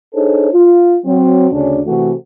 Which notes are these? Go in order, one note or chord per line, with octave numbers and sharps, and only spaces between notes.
D4 D#4 G#4 A4 C5 C#5
F4
F#3 C4
D2 C#3 C#4 D4
C3 E3 A3 F#4